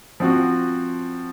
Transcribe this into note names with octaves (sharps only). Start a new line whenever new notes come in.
F3 C4 F#4